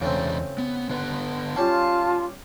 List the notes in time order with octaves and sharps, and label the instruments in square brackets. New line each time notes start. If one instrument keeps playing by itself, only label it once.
[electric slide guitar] E2 D4 [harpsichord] C#3 A3 C4
[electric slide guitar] B3
D3 B3 B4
[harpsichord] G3 C#4 F5 [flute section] F4 [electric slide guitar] A5